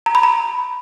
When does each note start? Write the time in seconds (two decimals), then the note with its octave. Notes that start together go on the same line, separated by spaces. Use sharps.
0.06 A#5
0.15 B5
0.23 A#5